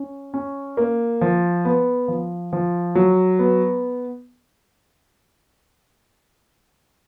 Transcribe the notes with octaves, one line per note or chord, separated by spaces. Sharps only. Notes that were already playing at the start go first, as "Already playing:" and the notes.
Already playing: C#4
C#4
A#3
F3
B3
F3
F3
F#3
B3